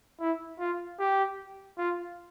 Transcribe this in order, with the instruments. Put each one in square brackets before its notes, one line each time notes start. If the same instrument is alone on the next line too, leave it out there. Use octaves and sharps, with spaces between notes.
[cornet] E4
F4
G4
F4